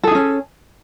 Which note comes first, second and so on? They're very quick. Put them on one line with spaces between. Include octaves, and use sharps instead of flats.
A4 G#4 D#4 C#4